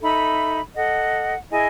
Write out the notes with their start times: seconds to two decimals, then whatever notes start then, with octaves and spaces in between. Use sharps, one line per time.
0.01 D#4 A4 E5 B5
0.75 A4 D#5 F#5
1.50 E4 G#4 D#5 G#5